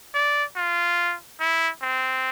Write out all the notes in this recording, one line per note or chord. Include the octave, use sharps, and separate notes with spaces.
D5
F4
E4
C4